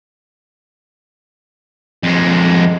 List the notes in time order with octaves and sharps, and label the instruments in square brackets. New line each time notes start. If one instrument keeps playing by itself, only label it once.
[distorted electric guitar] F2 G#3